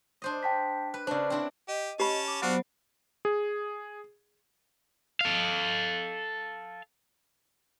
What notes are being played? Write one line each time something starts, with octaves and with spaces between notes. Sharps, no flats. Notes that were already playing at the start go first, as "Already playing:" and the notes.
D4 C5 D#5
G5 A5 B6
B4
C#3 D4 C5 D5
C4 D4 E4
G4 D#5
C#4 G4 A5 B5
D6
F#3 B3 D4 F#4 C5 F5
G#4
A4 F5